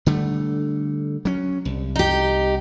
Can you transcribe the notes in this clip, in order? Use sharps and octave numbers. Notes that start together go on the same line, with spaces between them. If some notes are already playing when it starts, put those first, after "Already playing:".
D3 G3 A3
F#3 C#4
C2
D#4 G4